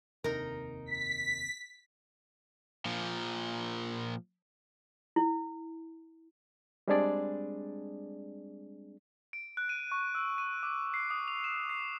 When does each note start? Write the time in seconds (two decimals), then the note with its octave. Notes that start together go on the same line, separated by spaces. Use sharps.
0.24 F1 D#2 C3 D#4 A#4
0.86 B6
2.85 A#2 F3
5.16 E4
6.88 G3 G#3 C4 D4 G#4 D5
9.33 D7
9.57 F#6
9.69 D#7
9.92 C#6
10.15 E6
10.38 D#7
10.63 D6
10.94 C7
11.10 D#6
11.28 F7
11.44 E7
11.69 C7